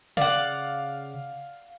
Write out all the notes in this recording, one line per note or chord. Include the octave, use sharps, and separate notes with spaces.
C#3 D5 F5 F#5